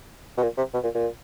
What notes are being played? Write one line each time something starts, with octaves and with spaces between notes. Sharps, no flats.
B2
A#2
C3
B2
A#2
A#2